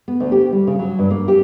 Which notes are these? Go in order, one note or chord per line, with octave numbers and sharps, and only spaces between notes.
B3
D2
G4
G3
C#3
F#3
G2
A#3
G4